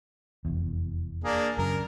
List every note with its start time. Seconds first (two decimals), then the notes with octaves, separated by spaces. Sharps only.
0.45 F1 E2
1.24 A#3 D4 G#4
1.58 F#2 C#3 F#3 A#4